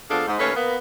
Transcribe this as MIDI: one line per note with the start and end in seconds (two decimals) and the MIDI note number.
0.10 0.23 53
0.10 0.23 59
0.10 0.23 62
0.10 0.23 68
0.10 0.23 69
0.10 0.23 77
0.27 0.39 44
0.39 0.52 39
0.39 0.52 57
0.39 0.52 61
0.39 0.52 71
0.39 0.52 73
0.39 0.52 77
0.56 0.76 58
0.56 0.76 59